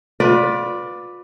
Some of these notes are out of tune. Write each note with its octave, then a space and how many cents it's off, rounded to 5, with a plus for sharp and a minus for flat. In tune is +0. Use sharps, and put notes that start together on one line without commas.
F4 +35 B4 +0 D5 +0